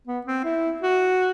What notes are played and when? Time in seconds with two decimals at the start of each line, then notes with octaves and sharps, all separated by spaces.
0.07 B3
0.26 C4
0.44 E4
0.82 F#4